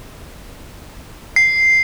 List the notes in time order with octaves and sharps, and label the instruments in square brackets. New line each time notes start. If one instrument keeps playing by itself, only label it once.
[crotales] C7